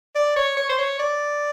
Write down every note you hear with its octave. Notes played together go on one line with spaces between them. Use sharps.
D5
C#5
C#5
C5
C#5
D5